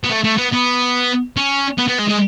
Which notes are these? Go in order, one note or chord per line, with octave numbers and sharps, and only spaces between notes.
B3
A3
A3
B3
B3
C#4
B3
B3
G#3
G#3